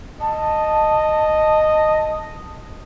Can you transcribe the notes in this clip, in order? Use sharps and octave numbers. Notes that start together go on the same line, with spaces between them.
D#5 A5